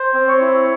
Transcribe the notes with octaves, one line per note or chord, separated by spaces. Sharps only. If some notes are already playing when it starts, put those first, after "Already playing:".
Already playing: C5
C4
C#5
E4